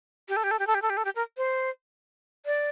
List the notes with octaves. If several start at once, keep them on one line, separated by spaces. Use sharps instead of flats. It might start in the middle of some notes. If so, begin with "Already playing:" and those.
G4
A4
G4
A4
G4
A4
G4
A4
G4
A4
G4
A#4
C5
D5